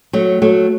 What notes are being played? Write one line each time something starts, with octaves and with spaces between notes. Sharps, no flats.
F#3 A3
F#3 A3